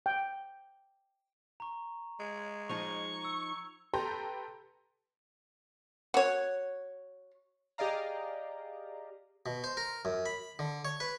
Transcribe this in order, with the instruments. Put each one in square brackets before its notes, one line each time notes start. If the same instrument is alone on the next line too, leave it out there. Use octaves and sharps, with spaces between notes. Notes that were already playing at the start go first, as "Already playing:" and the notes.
[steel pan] G5
[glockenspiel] A#5 C#6
[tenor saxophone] G#3 [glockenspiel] G#6
[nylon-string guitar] F3 D#4 A5 [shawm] C#6 [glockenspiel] F7
[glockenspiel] E6
[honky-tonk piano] G4 A4 B4 G5 A#5 C6
[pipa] F#4 C#5
[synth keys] G4 G#4 D5 D#5 F5 A#5
[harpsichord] B2
C5
A#4
F#2
B5
D3
C#5
B4